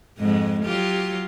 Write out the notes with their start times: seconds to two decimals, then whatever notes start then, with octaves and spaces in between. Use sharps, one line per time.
0.18 F2 G#2 G#3
0.64 F#3 F4 G4